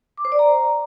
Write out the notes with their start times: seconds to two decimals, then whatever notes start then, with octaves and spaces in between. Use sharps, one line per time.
0.17 D6
0.25 C5
0.32 D5
0.39 A#5